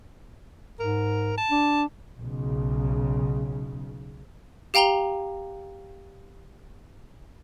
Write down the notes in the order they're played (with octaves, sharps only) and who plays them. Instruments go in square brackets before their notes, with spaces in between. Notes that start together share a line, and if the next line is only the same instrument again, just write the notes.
[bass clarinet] G#2 [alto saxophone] A#4
[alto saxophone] A5
[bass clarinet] D4
[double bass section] B1 C#3
[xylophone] G4 F5 G5 A#5 F7 G7